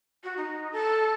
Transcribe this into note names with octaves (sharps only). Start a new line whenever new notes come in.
F#4
D#4
A4